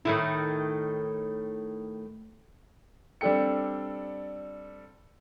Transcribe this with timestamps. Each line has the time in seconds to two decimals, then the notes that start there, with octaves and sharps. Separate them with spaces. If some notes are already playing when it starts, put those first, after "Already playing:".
0.05 A2 D#3 E4
3.21 G3 C4 D4 A4 G5 C#7